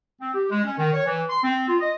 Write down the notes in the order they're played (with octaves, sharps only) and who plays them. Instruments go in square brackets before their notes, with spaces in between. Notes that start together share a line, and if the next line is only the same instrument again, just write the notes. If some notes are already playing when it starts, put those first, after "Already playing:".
[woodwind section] C4
G4
G#3
C#4
D#3
C#5
E3
C6
C4
F4
D#5